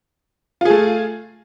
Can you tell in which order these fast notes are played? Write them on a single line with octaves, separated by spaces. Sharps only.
F4 G#4 A3